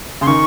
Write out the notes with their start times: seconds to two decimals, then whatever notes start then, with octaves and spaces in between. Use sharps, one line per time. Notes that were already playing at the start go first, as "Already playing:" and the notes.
0.21 C#3 C6
0.27 D#3 C#6